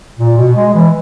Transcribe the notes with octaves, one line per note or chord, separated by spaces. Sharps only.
A#2
B2
G#3
E3